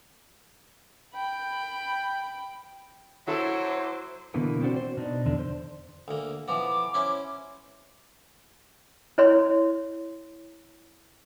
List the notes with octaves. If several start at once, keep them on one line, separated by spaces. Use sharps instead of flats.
G5 B5
F#3 E4 A4 C5 D6
B2 D3 E3 A#3 B3
C4 D4 F#4 C5
C5
B2 D4 D#4
E2 D3 D4
C5
D2 A#3
E3 F3 B3 D6
C#4 E4 C5
E4 C#5 C6